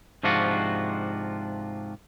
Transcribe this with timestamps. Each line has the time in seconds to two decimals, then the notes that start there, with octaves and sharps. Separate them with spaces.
0.23 G#2 C3 F3 D4 F4 F#4